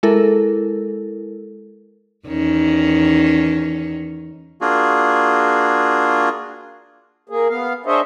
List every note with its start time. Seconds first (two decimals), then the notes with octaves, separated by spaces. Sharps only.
0.03 G#3 E4 A4 A#4
2.27 E2 D#3 C#4
4.61 A#3 D4 F4 F#4 G#4
7.29 A#3 G#4
7.49 B3 F5
7.86 D4 G#4 C5 C#5 D#5 E5